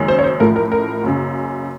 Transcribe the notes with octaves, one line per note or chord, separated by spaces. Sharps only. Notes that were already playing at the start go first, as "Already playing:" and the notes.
Already playing: F#1 F#2 D#3 G#3 C#4
C5
C#5
C5
A1 A2 F3 A3 A#4
A#4
A#4
F#1 F#2 C#3